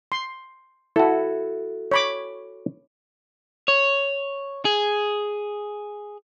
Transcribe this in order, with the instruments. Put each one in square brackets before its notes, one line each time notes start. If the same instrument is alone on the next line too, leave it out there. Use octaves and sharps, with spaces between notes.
[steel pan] C6
[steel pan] E4 [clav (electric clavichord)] F#4 A4
[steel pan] C#5 B5 D6
[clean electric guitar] C#5
G#4